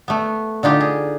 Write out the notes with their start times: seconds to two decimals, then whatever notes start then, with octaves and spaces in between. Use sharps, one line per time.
0.08 A3 B3
0.63 D3 D#4 F4 G4
0.81 G#4